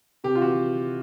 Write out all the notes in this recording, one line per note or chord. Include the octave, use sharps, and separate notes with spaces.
C3 G4
F4
E3 F#4